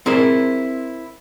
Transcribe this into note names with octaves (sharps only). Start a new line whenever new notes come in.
C4 E4 G#4 A#4 C5